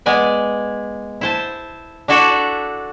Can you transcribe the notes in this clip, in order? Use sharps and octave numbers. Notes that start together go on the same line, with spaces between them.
G#3 B3 D5 G#5
E4 C5 A5
D4 E4 F#4 A4 D5 E5